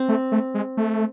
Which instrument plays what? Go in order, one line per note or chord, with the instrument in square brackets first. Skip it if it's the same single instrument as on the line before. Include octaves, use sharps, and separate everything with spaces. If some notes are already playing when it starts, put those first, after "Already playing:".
Already playing: [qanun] C4
[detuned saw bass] A3
A3
G#3
A3